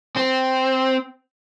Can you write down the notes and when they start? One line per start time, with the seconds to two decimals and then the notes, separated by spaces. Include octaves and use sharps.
0.16 C4